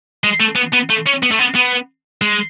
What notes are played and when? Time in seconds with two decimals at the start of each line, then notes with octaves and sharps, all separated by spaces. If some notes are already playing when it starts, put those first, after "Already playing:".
0.24 G#3
0.40 A3
0.56 B3
0.73 B3
0.90 A3
1.07 C#4
1.23 B3
1.31 A3
1.39 B3
1.55 B3
2.21 G#3